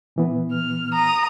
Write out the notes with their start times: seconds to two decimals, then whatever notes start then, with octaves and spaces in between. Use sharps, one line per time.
0.16 A#2 E3 B3
0.52 F6
0.94 A#5 D#6